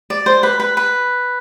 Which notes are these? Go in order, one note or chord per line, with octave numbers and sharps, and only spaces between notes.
D5
C5
B4
B4
B4